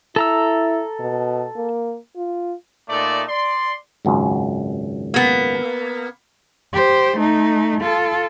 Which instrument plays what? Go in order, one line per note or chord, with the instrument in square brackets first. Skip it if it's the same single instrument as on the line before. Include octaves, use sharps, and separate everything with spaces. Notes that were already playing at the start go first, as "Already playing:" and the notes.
[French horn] E4 [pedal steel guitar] A4 A#5 E6
[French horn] B2
A#3
F4
[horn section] A#2 A3 D#4 A4 D5
D5 C6
[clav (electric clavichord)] G#1 C#2 F#2
[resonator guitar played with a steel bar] A#3 B3
[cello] G4 C5
A3 D#4
F4 A4